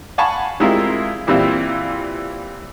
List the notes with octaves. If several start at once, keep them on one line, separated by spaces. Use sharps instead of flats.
F5 F#5 G#5 A5 B5 C#6
G3 G#3 C4 E4 F4 A#4
A#2 E3 G3 C4 E4 F4